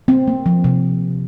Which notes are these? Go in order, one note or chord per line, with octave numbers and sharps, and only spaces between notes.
C4
A#3
F3
C3